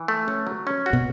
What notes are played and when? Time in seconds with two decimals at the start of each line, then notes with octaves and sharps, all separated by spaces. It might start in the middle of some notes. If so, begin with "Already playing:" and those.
Already playing: E3
0.08 A3
0.28 C#4
0.47 F#3
0.67 C#4
0.86 F#4
0.93 B2